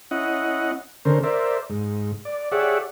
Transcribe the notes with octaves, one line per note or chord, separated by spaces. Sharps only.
C#4 E4 D#5 F#5
D3 C#4 A#4 C5
A#4 C5 D5 E5
G#2
D5
G4 G#4 C#5 D5 E5 F#5